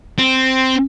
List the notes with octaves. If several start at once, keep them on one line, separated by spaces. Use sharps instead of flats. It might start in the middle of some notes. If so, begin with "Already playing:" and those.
C4